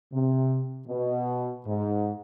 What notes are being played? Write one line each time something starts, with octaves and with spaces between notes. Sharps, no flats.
C3
B2
G#2